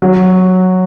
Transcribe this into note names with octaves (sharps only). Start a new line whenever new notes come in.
F#3